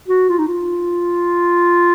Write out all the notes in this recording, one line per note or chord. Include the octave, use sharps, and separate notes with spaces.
F#4
F4
D#4
F4